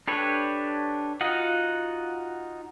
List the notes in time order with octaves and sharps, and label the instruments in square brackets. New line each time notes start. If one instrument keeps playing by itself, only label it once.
[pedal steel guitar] D4 G4 A4 B4 C#5
D#4 F4 F#4 D#5 F#5